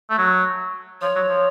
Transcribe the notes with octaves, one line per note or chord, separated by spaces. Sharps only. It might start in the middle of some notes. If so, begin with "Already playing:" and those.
A3
F#3
F3 C#5
F#3
F3